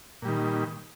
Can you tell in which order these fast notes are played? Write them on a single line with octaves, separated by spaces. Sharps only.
A#2 G3 D#3